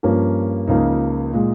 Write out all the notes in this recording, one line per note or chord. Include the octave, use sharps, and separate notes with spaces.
G2 F3 A#3 C#4
C#2 C#3 F3 A#3 D#4
A#2 G#3